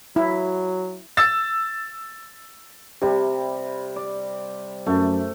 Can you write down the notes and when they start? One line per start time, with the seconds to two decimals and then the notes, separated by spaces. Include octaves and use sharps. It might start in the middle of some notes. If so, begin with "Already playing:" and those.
0.16 F#3 E4
1.17 E6 A6
3.02 C3 G3 G4
3.96 D5
4.86 F#2 A3